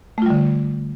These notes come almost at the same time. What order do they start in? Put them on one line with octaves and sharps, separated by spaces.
A3 F4 G3 D3